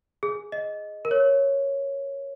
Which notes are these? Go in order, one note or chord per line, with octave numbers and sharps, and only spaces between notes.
G#4
D#5
A#4
C#5